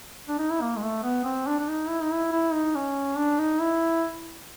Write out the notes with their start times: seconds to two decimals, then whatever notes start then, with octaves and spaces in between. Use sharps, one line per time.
0.28 D4
0.39 D#4
0.51 E4
0.61 A#3
0.77 G#3
0.83 A3
1.03 B3
1.25 C4
1.47 D4
1.59 D4
1.68 D#4
1.89 E4
2.02 D#4
2.13 E4
2.33 E4
2.53 D#4
2.75 C#4
3.17 D4
3.39 D#4
3.61 E4